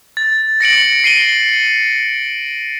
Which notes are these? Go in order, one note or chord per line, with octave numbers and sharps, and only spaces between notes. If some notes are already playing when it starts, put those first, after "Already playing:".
A6
A#6 C#7 D7 F#7
C7 D#7 G7